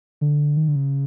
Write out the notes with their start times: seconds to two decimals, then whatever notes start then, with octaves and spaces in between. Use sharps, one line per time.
0.21 D3
0.57 D#3
0.68 D3
0.76 C#3